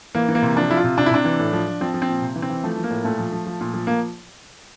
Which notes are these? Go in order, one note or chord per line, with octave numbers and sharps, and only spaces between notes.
E3 A#3
E3
A#3
C3
F3 D4
F3 E4
F4
C3
C3 D4
E4
C3 D4
E3
A2
F3
F3
F3 C4
F3
C4
A#2
C3
E3
C4
E3
F3 A3
F3
A#3
A2
A#2 A3
F3
F3
F3
A#2
F3
A#3